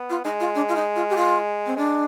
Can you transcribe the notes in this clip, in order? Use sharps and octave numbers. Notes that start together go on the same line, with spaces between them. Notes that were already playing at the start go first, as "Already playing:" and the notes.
Already playing: B3
F4
G#3 D#4
F4
D4
F4
D#4
F4
G4
F4
C4
G#3 D4